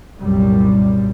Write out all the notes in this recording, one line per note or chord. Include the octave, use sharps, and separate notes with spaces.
C2 F#2 A#2 G3